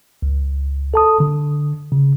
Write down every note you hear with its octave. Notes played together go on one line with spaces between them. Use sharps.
C#2
A4 A5 D#6
D3
C#3